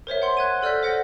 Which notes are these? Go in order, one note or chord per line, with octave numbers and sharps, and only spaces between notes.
A#4 C5 C#5 E5
F#5 C6 G7
F#6 G#6 D#7
A4 D5 F6 G6 B6
C5 F#5 A#6